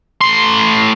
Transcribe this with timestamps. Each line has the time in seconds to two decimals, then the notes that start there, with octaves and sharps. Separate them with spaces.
0.21 A2 C6